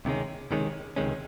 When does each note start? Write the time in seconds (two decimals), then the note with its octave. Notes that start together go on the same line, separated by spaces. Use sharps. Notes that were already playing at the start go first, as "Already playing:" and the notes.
0.05 C#2 C3 D#3 G#3 C#4
0.51 C#2 C3 D#3 G#3 C#4
0.96 C#2 C3 D#3 G#3 C#4